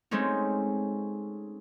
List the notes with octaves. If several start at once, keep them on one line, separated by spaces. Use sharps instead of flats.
G#3 A3 C4 C#4 D#4